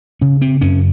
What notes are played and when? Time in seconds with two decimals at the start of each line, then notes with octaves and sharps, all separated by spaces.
0.21 C#3 C#4
0.42 C4
0.61 F#2 C#4